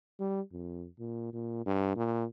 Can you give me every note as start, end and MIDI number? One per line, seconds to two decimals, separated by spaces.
0.20 0.41 55
0.52 0.86 41
0.99 1.31 46
1.33 1.64 46
1.66 1.94 43
1.96 2.24 46